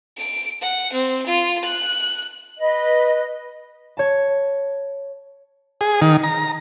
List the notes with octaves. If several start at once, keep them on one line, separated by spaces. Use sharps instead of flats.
D7
F#5
C4
F4
F#6
B4 D#5
C#5 A5
G#4
D#3
A#5